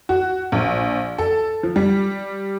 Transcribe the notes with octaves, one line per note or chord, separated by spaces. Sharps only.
F#4
A#1
A4
F3
G3